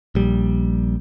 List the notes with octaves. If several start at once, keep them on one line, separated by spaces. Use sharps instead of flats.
A#1 G3